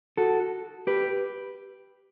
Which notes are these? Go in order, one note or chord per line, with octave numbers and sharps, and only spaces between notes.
F#4 A4
G4 B4